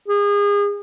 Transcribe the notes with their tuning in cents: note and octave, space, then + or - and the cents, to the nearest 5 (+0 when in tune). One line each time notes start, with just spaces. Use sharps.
G#4 -35